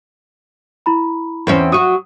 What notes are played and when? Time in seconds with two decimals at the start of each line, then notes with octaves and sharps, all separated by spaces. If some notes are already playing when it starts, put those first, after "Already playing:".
0.86 E4 A#5 B5
1.47 E2 C4 C#4
1.72 F#3 F#4 D#6 D#7